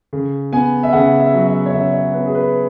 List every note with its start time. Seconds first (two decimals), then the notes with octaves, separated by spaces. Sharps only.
0.13 C#3
0.53 B3 G#5
0.83 E5
0.93 C#3 F#5
1.20 E5
1.34 F#3
1.47 E5
1.66 C#5
1.74 C#3 E5
1.94 C#5
2.14 B3 B4
2.26 G#4
2.35 B4